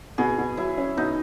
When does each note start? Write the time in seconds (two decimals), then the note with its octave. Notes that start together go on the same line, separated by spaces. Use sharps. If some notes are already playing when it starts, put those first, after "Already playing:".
0.18 B2 G#4
0.38 B2
0.57 F#3 E4
0.78 C#4
0.97 B2 D#4